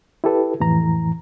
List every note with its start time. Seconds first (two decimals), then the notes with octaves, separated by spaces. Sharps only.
0.24 E4 G4 A4 B4
0.60 F2 A2 E3 A#5